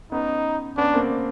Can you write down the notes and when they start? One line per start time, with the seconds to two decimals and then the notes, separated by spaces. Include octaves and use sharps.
0.12 B3 C#4 D#4
0.77 B3 C#4 D4
0.94 A#3 C4